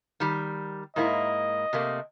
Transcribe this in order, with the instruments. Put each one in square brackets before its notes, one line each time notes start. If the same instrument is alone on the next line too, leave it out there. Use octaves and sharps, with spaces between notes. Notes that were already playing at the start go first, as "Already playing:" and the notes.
[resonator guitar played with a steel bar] D#3 G3
[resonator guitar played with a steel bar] G#2 A#3 E4 [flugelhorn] D#5
[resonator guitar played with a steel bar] C3 A3 A#3